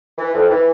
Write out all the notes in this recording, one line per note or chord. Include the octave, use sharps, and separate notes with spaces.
E3
F2
E3